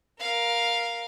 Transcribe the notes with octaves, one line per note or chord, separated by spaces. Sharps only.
A#4 F5